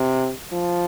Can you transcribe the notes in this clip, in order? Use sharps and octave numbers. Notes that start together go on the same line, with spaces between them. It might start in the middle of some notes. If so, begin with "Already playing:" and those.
Already playing: C3
F3